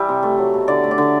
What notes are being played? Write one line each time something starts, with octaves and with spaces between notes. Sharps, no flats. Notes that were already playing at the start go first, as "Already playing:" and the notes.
Already playing: E3 G3 E5
C3
A3
F#3
B2
D3 D5
A3
D5
D3